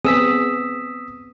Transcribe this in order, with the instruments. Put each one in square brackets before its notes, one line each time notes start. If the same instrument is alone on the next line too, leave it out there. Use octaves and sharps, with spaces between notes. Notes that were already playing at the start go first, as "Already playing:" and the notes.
[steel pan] B3 C4 G#4 [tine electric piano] D#6 E6 B6